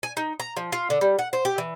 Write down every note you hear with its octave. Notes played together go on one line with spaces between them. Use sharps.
G#5
D#4
A#5
F3
F4
D3
G3
F#5
C5
G4
E3